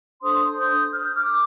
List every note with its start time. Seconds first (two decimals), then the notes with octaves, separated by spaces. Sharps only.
0.22 D4 A4 C5 C6 D#6
0.58 D#6 G6
0.93 F6
1.05 G6
1.15 D6 F6